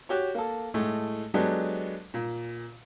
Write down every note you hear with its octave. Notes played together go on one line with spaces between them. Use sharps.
F#4 G4 C#5
A#3 A4
A2 G#3 A3
F#3 G#3 B3 D4 G4 A4
A#2